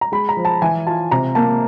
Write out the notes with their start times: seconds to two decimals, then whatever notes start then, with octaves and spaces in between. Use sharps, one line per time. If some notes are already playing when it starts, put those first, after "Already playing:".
0.01 A#5
0.12 G#3 B5
0.29 A#5
0.37 F3
0.45 A5
0.62 E3 G#5
0.86 F4 A5
1.11 C3 A#5
1.35 A#3 A5